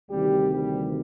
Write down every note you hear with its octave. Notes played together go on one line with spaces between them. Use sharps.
D2 C3 D#3 G3 G4
G3 G4